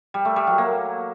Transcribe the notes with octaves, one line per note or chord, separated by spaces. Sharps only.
G3
A3
G3
F#3
A#3